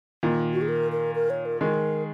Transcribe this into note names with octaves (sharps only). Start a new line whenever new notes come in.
A#2 D#3
F#4
G#4
A#4
A#4
A#4
C#5
A#4
D#3 G#3 A#4